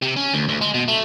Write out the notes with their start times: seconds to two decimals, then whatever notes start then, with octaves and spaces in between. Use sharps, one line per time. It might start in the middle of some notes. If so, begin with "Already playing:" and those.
0.02 C3
0.16 C#4
0.34 D2
0.49 D2
0.61 G#3
0.74 B2
0.88 A3